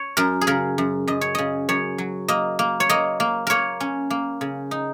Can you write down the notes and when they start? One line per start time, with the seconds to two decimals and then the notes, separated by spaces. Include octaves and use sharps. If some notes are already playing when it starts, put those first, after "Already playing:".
Already playing: C#5
0.17 F#2 A#4
0.41 G#4
0.47 C#3 A#4
0.78 F#2
1.07 F#2 D#5
1.21 C#5
1.35 C#3 D#5
1.69 F#2 C#5
1.98 F#3
2.28 A#3 D#5
2.59 A#3
2.80 C#5
2.89 A#3 D#5
3.20 A#3
3.47 A#3 A#4 C#5
3.80 C#4
4.10 A#3
4.41 C#3
4.71 D#4